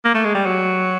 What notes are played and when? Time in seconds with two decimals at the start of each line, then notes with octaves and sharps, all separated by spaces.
0.05 A#3
0.14 A3
0.25 G#3
0.35 G3
0.46 F#3